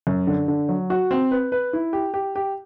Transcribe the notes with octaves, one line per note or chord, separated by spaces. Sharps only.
F#2
D3
D3
F#3
F#4
C4
B4
B4
E4
G4
G4
G4